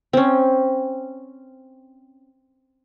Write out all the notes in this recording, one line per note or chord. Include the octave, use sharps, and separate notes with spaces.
C4 C#4